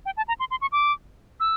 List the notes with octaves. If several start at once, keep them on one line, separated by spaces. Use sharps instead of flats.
G5
A5
A#5
C6
C6
C#6
D6
E6